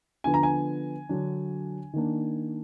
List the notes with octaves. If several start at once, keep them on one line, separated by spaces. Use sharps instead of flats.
D3 F3 B3 D4 G#5
A#5
G#5
D3 F#3 D4
D#3 A#3 D4